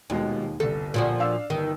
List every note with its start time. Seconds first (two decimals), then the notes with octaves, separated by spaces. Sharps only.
0.10 D#1 D#2 B2 G#3
0.60 G1 C2 A4
0.94 A#2 F3 F#4
1.19 D4 F5 E6
1.50 G1 D#3